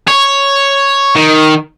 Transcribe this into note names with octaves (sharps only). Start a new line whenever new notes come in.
C#5
D#3